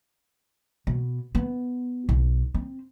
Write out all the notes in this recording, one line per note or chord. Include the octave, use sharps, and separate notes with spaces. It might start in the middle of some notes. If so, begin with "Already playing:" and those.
B2
B3
B1
C4